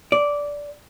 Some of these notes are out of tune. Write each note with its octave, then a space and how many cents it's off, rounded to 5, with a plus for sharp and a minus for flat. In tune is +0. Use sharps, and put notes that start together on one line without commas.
D5 -10